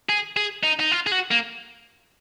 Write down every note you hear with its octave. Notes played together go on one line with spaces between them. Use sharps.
G#4
G#4
D#4
D#4
F4
G#4
F#4
A#3